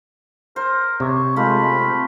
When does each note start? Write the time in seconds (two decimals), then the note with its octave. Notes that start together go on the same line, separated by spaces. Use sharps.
0.56 A#4 C5
1.00 C3 C#5
1.36 G#3 A3 F4 B5
1.72 C4